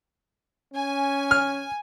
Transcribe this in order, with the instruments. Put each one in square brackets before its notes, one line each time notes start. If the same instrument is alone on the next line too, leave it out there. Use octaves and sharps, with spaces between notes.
[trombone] C#4 [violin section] G#5
[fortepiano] F6